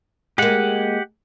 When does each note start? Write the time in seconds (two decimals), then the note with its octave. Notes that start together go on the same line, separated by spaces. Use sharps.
0.38 G#3 A#3 G4 F#5